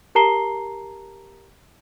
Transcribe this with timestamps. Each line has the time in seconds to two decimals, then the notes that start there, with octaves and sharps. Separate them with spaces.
0.15 G4 A#4 A5 A#5 C7 G7